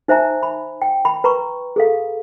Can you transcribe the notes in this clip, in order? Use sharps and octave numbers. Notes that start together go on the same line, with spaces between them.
D#4 C5 E5 G#5 A#5
B5
G5
B5
B4 A#5 B5 C#6
G#4 A4 F5